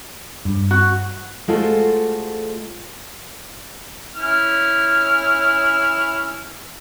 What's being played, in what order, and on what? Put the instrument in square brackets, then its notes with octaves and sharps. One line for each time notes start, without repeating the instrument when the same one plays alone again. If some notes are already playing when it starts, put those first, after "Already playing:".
[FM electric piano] G2
[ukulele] F#4
[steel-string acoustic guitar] G#3 A3 F4 F#4 A4 C5
[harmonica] C#4 E4 F6